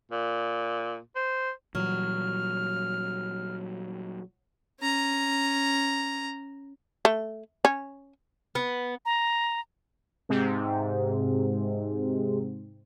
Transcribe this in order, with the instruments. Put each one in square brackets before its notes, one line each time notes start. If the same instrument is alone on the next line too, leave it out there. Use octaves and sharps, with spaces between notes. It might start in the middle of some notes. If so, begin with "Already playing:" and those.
[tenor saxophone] A#2
C5
[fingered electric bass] A#2 E3 G3 [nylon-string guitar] F#3 [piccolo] F6
[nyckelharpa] C#4 A#5
[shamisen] A3
C#4
[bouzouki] B3
[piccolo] A#5
[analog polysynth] G#2 C3 C4